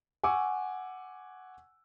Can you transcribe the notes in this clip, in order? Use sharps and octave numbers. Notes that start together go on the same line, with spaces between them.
F#5 G#5 C#6 D6 E6